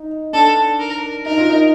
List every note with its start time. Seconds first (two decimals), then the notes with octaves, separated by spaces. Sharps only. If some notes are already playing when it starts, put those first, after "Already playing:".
Already playing: D#4
0.33 D4 A4
0.80 A#4
1.26 D#4 A#4
1.38 F4
1.50 D#4